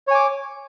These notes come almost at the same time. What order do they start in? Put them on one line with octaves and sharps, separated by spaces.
C#5 G#5 D6